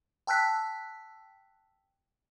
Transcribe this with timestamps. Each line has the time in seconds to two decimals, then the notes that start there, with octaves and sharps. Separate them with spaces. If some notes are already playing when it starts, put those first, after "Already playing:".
0.27 G5 A5 E6 F#6 B6